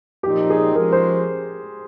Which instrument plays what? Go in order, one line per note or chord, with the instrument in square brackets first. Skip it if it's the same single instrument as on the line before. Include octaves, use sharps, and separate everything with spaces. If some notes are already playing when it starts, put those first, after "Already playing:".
[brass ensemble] A#2 F3 C4 D#4 [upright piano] G4
[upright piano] G#4
[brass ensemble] F3 G#3 C#4 [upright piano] A#4
[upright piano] C5